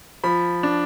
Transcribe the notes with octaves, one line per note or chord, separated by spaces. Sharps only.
F3 B5
D4